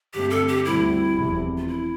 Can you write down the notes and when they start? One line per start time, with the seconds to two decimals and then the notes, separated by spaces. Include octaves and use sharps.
0.14 G2 D3 A3 C4 G4
0.31 A4
0.48 G4
0.65 D2 D3 G3 C4 E4
1.16 F1 E2 C3
1.58 F4
1.68 E4